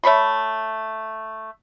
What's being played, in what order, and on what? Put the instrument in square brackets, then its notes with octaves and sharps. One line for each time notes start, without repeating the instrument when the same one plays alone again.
[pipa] A3 C#5 B5 C6